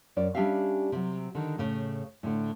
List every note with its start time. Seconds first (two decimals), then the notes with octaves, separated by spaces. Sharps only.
0.16 F#2 C#4 D5
0.35 G3 C#4 D4 G4 E5 F5
0.92 C3 F#3
1.35 D3 D#3
1.58 A2 C#3
2.23 A2 D3